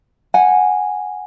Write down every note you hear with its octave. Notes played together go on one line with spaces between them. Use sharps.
F#5 G#5